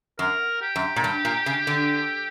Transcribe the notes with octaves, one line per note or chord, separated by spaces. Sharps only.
F#2 A#4
G4
F#2
A#2
G2
A#2
C#3
D3